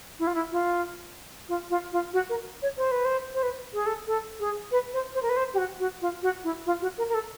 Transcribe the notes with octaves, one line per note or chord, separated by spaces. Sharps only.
E4
F4
E4
F4
F4
F4
F4
F#4
A#4
C#5
C5
B4
C5
C5
B4
G#4
A4
A4
G#4
B4
C5
C5
A#4
B4
C5
G4
F#4
F#4
F4
F#4
E4
F4
F#4
A#4
A#4
A4